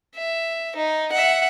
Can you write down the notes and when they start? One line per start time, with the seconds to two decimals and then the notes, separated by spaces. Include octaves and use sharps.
0.15 E5
0.76 D#4
1.12 E5 F#5